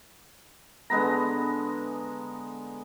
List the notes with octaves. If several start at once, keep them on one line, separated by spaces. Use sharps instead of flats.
D3 G#3 B3 A#5